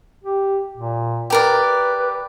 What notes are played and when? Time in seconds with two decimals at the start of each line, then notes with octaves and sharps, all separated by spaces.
0.23 G4
0.77 A#2
1.30 G4 A#4 B4 D5